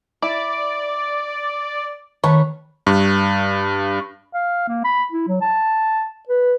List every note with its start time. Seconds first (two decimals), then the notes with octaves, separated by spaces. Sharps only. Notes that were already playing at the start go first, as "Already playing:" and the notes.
0.22 E4 D5
2.24 D#3 A3 B4 C#5
2.87 G2
4.34 F5
4.68 A#3
4.84 B5
5.12 E4
5.28 F#3
5.41 A5
6.29 B4